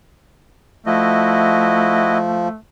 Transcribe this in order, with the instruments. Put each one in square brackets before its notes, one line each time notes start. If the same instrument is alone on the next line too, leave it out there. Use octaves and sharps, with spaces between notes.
[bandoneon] F3 [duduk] A3 [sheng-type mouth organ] E4 F#4 D#5